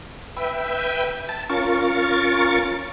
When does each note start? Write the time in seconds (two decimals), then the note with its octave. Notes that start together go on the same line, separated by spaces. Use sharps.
0.36 B4 E5 G5
1.29 A5
1.50 C#4 F4 A#4 C#6 A6